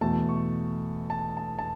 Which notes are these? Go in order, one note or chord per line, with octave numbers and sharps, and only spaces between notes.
E2 B2 A3 A5
C#6
A5
A5
A5